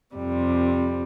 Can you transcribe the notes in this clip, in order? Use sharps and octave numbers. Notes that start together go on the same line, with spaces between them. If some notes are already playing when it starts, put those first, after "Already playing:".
F2 C3 G3